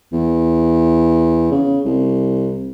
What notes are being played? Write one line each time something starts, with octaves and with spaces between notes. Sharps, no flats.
E2
C#3
C2